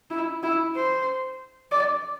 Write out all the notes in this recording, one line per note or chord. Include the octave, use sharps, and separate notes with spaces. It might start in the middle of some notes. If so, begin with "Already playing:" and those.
E4
E4
C5
D5